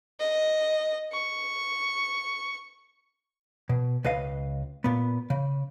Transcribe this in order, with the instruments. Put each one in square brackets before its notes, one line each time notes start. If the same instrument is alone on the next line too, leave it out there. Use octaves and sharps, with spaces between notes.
[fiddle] D#5
C#6
[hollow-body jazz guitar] B2
C#2 B4 D#5 F5
A#2 B3
C#3